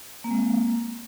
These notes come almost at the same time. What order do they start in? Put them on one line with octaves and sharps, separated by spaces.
A#3 C4 G#3